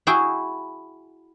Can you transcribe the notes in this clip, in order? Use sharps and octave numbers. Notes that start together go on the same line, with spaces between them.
E4 F#4 G#4 G5